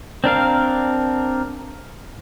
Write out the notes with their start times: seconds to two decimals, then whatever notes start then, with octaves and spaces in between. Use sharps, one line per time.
0.24 C4 D4 A#4 F5